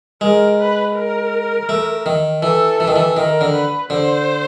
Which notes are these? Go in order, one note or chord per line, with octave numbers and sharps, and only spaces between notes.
G#3 A#4
B4
A#4
A3
D#3
E3 A4
E3
D#3
E3
D#3 A#4
D3
B4
D3 C5